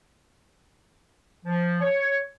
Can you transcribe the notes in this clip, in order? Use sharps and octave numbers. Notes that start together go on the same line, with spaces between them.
F3
C#5